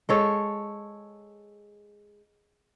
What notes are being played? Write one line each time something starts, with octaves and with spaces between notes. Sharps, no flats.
G#3 A4 C#5